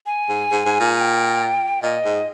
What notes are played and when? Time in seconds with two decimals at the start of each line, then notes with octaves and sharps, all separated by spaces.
0.06 G#5
0.29 G#2
0.51 G#2
0.66 G#2
0.80 A#2
0.95 G#5
1.00 G5
1.82 A#2 D#5
2.05 G#2